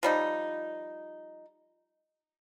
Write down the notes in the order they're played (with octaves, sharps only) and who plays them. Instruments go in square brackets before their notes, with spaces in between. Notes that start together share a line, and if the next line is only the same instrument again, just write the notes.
[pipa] F3 G3 D#4